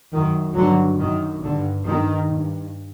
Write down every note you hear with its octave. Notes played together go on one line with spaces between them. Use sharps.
F#2 D#3
G2 D3 F#3
F#2 D#3
G2 D3
G2 D#3
G2